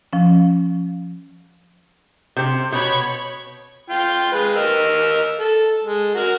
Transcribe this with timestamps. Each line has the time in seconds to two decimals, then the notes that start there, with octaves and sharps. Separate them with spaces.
0.13 F3 C#4
2.37 C3 C4
2.72 B2 C#5 B5 G#6
3.90 F4 G5
4.32 G#3 B4
4.56 A#4 D#5 E6
5.39 A4
5.84 G#3
6.15 F#4 A#4